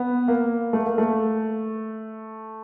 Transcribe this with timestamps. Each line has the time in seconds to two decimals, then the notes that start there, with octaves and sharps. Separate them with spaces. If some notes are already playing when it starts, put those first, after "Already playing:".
Already playing: B3
0.28 A#3
0.73 A3
0.86 A#3
0.98 A3